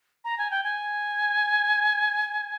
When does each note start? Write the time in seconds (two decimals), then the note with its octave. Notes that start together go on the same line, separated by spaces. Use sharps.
0.24 A#5
0.38 G#5
0.51 G5
0.64 G#5